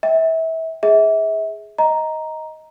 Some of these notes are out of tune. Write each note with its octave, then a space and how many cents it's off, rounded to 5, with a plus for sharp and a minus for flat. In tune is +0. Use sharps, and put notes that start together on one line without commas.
E5 -30 G5 +0
G#4 +0 E5 -35
D#5 +10 A#5 +0